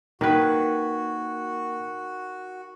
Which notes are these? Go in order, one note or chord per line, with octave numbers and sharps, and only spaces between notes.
D#3 A#3 F#4 A#4 B4 G#6